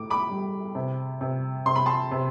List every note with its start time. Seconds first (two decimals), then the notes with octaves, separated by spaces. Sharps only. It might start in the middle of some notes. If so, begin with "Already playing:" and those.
Already playing: A2 D6
0.10 B5 D6
0.30 G3
0.75 C3
1.21 C3
1.66 C3 C6
1.76 B5
1.86 A5 C6
2.11 C3